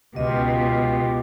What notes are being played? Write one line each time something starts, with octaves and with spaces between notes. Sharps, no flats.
C#2 B2 F4 G4 D#5